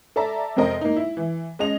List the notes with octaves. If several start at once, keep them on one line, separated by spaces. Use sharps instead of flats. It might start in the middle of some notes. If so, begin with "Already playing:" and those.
A4 D5 E5 A5 A#5
F2 C3 C4 A#4 D#5
A#3 D#4
E4
E3
G#3 C#4 D#5 F7